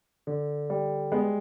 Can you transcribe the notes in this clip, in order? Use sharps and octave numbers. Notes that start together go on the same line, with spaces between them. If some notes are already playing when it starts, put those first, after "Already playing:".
D3
G3
G#3 B3